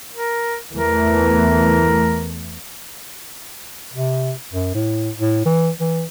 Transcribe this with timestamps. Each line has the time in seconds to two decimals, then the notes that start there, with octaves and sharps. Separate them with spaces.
0.14 A#4
0.75 E2 E3 A3 A#4
3.93 C3
4.53 F#2
4.74 A2
5.19 A2
5.45 E3
5.80 E3